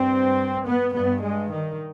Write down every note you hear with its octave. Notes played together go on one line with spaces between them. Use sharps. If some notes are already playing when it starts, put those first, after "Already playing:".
Already playing: G2 C4
B3
G2 B3
G#3
D#3